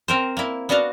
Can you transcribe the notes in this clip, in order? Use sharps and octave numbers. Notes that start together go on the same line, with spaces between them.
C4 A#4 C5
A#3 E4
B3 D4 F#4 D#5 F5